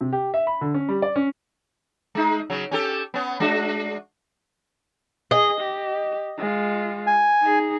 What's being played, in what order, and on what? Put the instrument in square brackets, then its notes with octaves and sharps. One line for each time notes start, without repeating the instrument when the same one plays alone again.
[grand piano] C3
G4
E5
B5
D3
C#4
G3
D5
C#4
[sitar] G#3 D#4
C#3 F#3
C#4 G4 A4
B3 C#4
G#3 D4 F#4
[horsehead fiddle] G#4 [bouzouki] D#5
[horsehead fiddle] G4
G#3 F4
[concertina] G#5
[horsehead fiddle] D#4 G#4